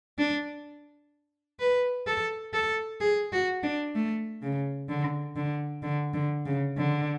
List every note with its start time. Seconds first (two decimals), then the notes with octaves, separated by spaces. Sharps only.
0.18 D4
1.60 B4
2.07 A4
2.53 A4
3.01 G#4
3.32 F#4
3.63 D4
3.95 A3
4.42 C#3
4.89 D3
5.36 D3
5.83 D3
6.14 D3
6.46 C#3
6.77 D3